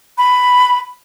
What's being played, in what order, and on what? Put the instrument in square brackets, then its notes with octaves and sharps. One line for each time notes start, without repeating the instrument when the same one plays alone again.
[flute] B5